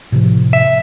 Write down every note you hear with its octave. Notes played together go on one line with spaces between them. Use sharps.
A2 C3 F3
E5